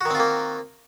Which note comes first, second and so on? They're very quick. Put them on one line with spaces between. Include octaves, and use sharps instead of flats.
F#4 D#3 C4 F4 A#3